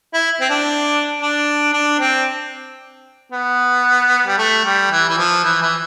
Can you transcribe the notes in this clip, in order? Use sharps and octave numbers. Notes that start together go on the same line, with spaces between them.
E4
C4
D4
D4
D4
C4
B3
G3
A3
G3
E3
E3
F3
E3
E3